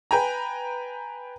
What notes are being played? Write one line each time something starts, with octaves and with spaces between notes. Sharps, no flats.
B4 G5 G#5 A#5